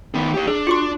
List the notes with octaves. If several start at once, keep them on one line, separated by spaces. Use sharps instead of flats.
D#3 B3
G4 C#5
D4 G#4
F4 F#4 C6